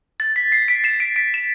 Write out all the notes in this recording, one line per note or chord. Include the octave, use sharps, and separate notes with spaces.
A6
B6
C7
B6 D7
C7 E7
B6 D7
B6 D7
E7